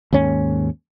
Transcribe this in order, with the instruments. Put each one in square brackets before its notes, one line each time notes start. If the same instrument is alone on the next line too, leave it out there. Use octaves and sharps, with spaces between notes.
[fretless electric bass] D#2 G#2 C#4